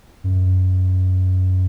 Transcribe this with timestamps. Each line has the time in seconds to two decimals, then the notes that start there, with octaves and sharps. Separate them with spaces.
0.24 F#2